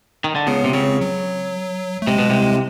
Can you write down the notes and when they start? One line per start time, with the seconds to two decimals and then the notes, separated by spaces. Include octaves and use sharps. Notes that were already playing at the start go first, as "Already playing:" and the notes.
0.24 D#3
0.35 D3
0.47 C#2 C#3 B3
0.64 C3
0.73 C#2 C#3 C4
1.01 F#3
2.02 A3
2.07 C3 G#3
2.19 B2
2.29 C2 C3